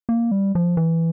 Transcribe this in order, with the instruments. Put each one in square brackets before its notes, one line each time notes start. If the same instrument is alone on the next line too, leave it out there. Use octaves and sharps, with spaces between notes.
[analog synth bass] A#3
G3
F3
E3